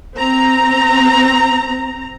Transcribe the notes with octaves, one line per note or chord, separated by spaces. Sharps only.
C4 A#5